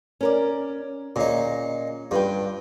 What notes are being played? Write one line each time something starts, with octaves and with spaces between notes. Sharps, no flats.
C#4 A#4 D5
A#2 C#4 D#4 G#4
G2 F4 B4 G5